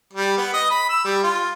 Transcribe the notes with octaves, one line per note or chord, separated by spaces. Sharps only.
G3
B3
D#5
B5
E6
G3
F4